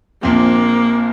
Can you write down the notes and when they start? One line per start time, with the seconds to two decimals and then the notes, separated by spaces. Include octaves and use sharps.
0.23 A#1 A#2 F3 A#3 C4